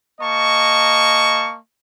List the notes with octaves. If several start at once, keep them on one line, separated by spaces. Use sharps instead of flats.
A#3 D#5 A5 C#6